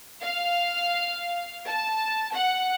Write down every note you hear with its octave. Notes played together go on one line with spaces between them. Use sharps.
F5
A5
F#5